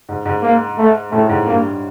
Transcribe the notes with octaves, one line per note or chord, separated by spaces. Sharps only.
G#2
G#2
A#3
A3
A2 A3
G#2
G2 A#3